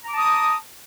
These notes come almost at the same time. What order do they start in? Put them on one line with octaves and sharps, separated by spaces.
A#5 D6 A5 D#6